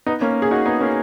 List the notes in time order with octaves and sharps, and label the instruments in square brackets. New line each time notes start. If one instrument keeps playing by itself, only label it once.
[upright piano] B3 D#4
A#3 C#4
G#4
D#4 F#4
B3 D#4
A#3 C#4